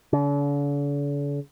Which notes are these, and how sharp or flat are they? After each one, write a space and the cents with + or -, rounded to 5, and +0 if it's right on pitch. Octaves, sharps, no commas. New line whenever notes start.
D3 -45